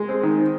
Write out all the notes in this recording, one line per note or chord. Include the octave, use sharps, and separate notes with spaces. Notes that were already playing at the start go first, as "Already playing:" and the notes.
Already playing: G#3
C4
D#3